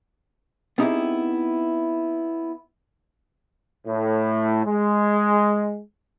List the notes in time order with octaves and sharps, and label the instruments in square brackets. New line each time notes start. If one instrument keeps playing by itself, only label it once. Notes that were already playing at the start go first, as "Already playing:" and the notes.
[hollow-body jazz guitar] B3 C4 D#4 E4 G4 G#4
[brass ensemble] A2
G#3